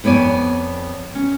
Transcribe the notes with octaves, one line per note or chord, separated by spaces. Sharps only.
F2 B3 C#5 D5 G#5
C#4